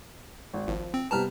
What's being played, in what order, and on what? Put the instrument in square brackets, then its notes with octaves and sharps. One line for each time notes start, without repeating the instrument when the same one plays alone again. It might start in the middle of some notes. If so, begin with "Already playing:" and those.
[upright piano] G#1
[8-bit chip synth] G#1 [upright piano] F3
[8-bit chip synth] C4
[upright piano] C3 G3 B3 [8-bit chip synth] A5 A#5 F6